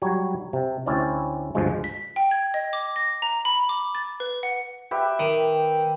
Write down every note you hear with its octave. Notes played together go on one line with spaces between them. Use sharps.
F#3 G3 C#5
C3
D2 C4 C#4 E4 D5
D2 G2 F3 G#3
B6
G5
G#6
D#5
D6
A#6
A#5
B5
D6
A6
B4
F#5
G4 B4 E5
D#3